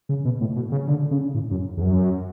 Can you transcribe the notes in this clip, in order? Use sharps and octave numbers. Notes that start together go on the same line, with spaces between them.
C#3
B2
A2
B2
C#3
D3
C#3
A2
F#2
E2
F#2